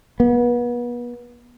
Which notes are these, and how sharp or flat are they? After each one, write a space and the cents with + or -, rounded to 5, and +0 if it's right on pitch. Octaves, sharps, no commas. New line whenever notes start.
B3 -35